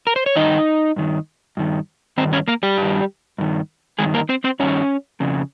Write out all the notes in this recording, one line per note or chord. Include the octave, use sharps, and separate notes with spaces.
A#4
C5
C#5
G2 D#3 D#4 D#5
G2 D#3
G2 D#3
G2 D#3 C4 C5
C#4 C#5
A#3 A#4
G3 G4
G2 D#3
G2 D#3
G2 D#3 G#3 G#4
A#3 A#4
C4 C5
C4 C5
G2 D#3 C#4 C#5
F2 C#3